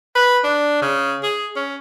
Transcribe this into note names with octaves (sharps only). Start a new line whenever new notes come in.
B4
D4
C#3
G#4
C#4